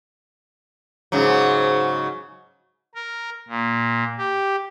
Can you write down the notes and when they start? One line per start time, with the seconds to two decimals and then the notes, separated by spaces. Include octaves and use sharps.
1.12 G#2 C#3 F#3
2.95 A#4
3.49 A#2
4.18 G4